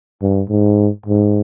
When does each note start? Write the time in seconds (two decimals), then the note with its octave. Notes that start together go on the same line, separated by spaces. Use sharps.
0.22 G2
0.49 G#2
1.06 G#2